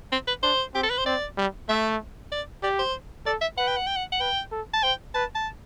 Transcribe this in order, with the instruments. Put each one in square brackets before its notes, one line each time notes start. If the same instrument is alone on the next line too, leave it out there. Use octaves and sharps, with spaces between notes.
[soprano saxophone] C4
B4
[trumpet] D4 [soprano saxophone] C5
[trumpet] C4 [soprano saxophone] G4
[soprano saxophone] A4
B4
C5
[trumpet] C4 [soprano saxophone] D5
[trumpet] G3
[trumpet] A3 [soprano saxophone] E5
[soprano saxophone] D5
[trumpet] G4 [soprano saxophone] D5
[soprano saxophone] C5
[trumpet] A4 [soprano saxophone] D5
[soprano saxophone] E5
[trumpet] B4 [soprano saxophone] F#5
[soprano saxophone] G5
F#5
G5
F#5
F#5
[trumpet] B4 [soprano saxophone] G5
[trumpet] A4
[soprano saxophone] A5
[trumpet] C5 [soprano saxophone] G5
[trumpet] B4 [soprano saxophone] A5
[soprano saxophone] A5